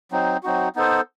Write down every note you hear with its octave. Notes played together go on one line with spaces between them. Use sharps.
F#3 C4 D#4
F#3 C4 D#4 F#4
B3 D#4 A4 C5